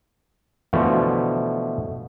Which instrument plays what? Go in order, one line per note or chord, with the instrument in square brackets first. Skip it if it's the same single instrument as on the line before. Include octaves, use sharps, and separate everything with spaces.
[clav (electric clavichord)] B2 D3 E3 F3 A3